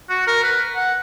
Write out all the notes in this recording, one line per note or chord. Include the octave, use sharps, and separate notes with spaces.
F#4
A#4
B4
F#5